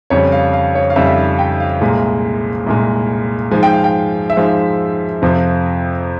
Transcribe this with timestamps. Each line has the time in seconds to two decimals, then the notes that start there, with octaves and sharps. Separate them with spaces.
0.10 F2 C#3 G3 C#5
0.32 F5
0.53 F5
0.75 C#5
0.90 F5
0.96 F2 C#3 G3 E5
1.07 E5
1.18 F5
1.39 G5
1.60 F5
1.81 C2 A#2 G#3
2.66 C2 A#2 G#3
3.51 G#2 F3 G#3 G#5
3.63 G5
3.73 F5
3.84 G5
4.30 E5
4.37 G#2 F3 G#3 F5
5.22 F2 C3 F3